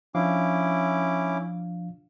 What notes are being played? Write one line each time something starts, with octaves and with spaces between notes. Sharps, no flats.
F3 C#4 D4 E4 F5 D6